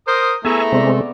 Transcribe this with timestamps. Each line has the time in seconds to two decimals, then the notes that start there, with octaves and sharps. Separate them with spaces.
0.07 A#4 C5 D#6
0.45 A3 B3 E4 G#4 E5 G#5 A#5
0.72 C3 G#3 B3 C4 D5